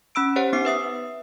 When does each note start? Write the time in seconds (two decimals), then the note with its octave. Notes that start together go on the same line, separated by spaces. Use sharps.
0.15 C#4 B5 E6 D7
0.36 G4 C5 C#5 F#5
0.53 B3 D#4 D6 C7
0.65 B4 E5 D#6 C7